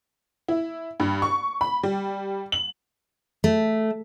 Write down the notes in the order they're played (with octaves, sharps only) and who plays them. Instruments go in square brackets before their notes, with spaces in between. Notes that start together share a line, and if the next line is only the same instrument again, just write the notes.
[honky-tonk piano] E4
G2
C#6
B5
G3
F#7
[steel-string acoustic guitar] A3